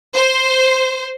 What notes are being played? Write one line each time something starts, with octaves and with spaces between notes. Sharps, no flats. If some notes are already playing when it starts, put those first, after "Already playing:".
C5